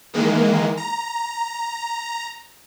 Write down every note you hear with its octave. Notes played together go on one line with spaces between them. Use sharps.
D#3 E3 G#3 A#3
A#5